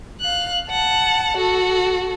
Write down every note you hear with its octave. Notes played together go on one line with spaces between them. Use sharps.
F5 F#6
F#5 A5
F#4 A4